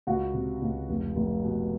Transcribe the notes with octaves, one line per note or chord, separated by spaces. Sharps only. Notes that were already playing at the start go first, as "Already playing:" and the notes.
C#2 F#4
C3
C#2
F1
F1
B2